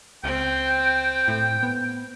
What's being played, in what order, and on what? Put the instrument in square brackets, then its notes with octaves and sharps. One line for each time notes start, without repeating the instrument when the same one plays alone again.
[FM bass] C#2 [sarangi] C4 [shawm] G5
[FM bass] A2
B3